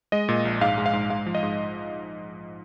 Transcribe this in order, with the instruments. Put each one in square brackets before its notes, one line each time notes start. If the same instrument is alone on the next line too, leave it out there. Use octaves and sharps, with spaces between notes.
[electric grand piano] G#3 D#5
A#2
A#1
G#2 F5
G#3
F5
G#2
G#3 F5
F3
D#5
G#2